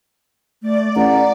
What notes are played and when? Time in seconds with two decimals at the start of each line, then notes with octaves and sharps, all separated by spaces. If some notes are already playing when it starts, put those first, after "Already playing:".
0.62 A3 D5
0.96 A1 F#5 A#5